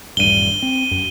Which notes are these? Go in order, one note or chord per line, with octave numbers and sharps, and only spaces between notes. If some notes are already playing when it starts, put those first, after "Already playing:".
D#1 A1 G2 D#7 G7
C4
F#2